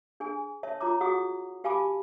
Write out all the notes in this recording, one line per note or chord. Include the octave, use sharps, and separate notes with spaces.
D4 G#4 G#5
C#5 E5 A5
F4 C#5 A#5 D6
F#4 G#4 F#5 D6 D#6
G4 F5 G#5 A5 B5 D6